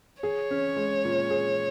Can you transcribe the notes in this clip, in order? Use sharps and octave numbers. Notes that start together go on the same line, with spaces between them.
G#4 C#5
C#4
G#3
A#2
G#4